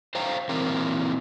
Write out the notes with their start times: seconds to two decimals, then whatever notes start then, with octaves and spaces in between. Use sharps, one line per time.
0.15 C5 F5 G5 A#5
0.49 A#2 E3 C4 A#4